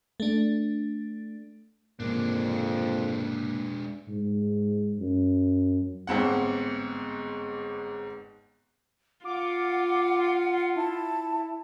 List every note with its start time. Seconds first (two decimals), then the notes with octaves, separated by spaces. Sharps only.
0.20 A3 D4
2.00 F2 G#2 C3 E3 G#3 A#3 D4
4.08 G#2
4.99 F#2
6.07 G1 G#2 C4 F#5
9.25 F4 F#5 D6
10.76 E4 A5